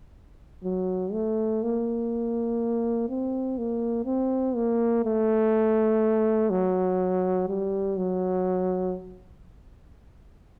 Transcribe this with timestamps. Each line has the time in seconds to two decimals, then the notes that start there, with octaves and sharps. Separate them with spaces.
0.64 F#3
1.13 A3
1.63 A#3
3.09 C4
3.58 A#3
4.06 C4
4.56 A#3
5.04 A3
6.50 F#3
7.49 G3
7.97 F#3